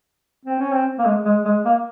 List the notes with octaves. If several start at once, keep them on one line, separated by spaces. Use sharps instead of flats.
C4
C#4
C4
A#3
G#3
G#3
G#3
A#3